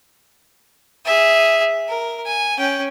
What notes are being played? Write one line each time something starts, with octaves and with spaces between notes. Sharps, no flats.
G#4 E5
A#4
G#5
C#4 G5